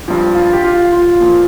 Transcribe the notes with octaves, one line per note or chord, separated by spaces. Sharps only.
G2 F3
F4
G4
F4
F4
A#2 F3